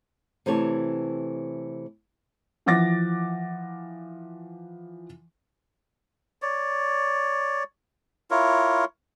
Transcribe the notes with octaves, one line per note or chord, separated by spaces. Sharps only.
C3 E3 A3 C#5 D5 A5
E3 F3 F#5 D6 A6 A#6
C#5 D5
E4 F4 A#4 C#5